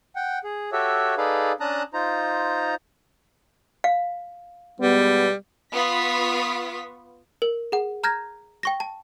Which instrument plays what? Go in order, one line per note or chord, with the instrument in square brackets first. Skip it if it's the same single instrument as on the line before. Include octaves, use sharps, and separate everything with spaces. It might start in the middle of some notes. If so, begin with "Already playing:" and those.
[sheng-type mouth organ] F#5 G5
G#4
F#4 G4 A4 C#5 E5
D#4 G#4 A4 B4 D5 F5
C#4 D4 A5 A#5 D#6 F#6
D#4 F4 C5 A#5
[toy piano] F5
[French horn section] B2 G#3 B3 [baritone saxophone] G3
[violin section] B3 F4 C#6 D#6 B6
[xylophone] A#4
G#4 F#5
A#5 F6 G6 G#6 A#6
G5 C#6 A#6
A5